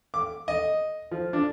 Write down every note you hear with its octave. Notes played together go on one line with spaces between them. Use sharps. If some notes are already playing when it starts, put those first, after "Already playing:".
D6
D#5
F3
D4